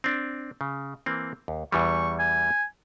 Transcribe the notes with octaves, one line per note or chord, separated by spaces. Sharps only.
C4 D4
C#3
E3 A#3 C4
D#2
E2 E3 G3 C#6
G#5